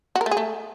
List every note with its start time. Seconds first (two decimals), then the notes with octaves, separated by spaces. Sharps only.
0.16 F#4
0.21 A#4
0.26 A3
0.31 G#4
0.37 A3